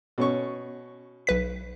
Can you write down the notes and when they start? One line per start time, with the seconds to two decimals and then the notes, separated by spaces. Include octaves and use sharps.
0.18 B2 C#4 C#6
1.27 B1 B4 B6